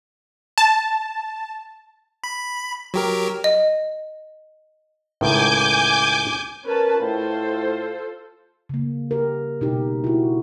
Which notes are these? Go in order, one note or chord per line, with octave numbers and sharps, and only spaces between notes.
A5
B5
F#3 G4 A#4
D#5
C#2 A2 D#3 G#5 D6 G6
C#4 A#4 B4 A5
A2 F4 A4 C5
C#3 A#3
G4 A#4
B2 D#4 G4
E4 F#4